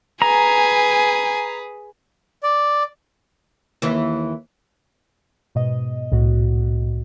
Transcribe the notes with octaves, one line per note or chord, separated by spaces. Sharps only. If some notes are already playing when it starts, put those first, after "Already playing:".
G#4 B4 G#5 A#5
D5
D#2 E3
G#2 B2 D#5
C2 A2 F#4